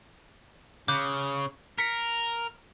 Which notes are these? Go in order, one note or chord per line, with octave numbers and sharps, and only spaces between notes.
C#3 D6 F#6 G6
A#4 B6 C#7